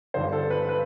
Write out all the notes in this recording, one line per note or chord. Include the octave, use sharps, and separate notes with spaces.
G1 G2 D3 C5
A4
B4
B4